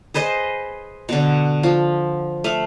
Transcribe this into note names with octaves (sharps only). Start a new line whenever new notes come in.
G#4 B4 C5 D#5
B2 D3
F3
A3 F5